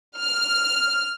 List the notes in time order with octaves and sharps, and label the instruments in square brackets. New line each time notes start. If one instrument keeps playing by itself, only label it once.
[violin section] F6